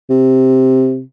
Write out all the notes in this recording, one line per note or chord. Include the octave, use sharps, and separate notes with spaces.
C3